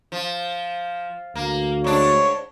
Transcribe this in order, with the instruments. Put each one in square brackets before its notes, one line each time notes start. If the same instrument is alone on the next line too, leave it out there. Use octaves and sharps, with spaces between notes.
[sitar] F3
[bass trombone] D2 [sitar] A#3
[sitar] G#2 D4 [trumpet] C#5